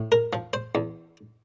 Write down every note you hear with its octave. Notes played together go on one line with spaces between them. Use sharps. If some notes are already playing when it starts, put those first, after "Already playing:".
Already playing: A2
A#4
F3
C5
E2